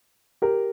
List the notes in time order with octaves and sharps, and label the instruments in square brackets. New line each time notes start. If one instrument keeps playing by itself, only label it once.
[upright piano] G4 A#4